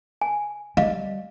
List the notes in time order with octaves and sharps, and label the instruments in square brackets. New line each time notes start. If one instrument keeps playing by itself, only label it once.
[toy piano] G#5
[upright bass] G3 [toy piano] D#5 F5